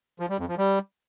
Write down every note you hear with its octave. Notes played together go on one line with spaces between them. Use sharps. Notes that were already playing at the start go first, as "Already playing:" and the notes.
F3
G3
F2
F3
G3